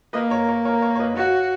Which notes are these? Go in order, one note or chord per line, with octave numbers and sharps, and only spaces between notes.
A#3 B4 D#5
A#4 C#5
A#4 C#5
A#4 C#5
A#4 C#5
C#5
B4 D#5
F#4 C#5 F5